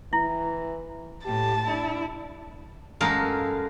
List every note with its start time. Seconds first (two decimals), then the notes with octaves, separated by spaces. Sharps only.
0.13 E3 E4
1.25 A2 G4 A5
1.68 D4 E4
3.01 F#2 G#3 A4 A#4 F5